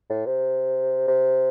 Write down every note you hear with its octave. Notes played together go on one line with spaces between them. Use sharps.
A2
C3
C3